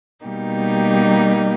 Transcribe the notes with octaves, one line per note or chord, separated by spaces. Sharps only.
B2 G3 A#3 D#4 G4